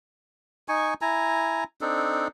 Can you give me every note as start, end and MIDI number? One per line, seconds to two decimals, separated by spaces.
0.68 0.94 63
0.68 0.94 80
0.68 0.94 85
1.02 1.64 64
1.02 1.64 80
1.02 1.64 82
1.81 2.28 60
1.81 2.28 62
1.81 2.28 63
1.81 2.28 69